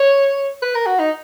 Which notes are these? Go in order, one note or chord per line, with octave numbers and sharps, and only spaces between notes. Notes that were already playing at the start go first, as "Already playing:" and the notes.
Already playing: C#5
B4
A#4
F#4
D#4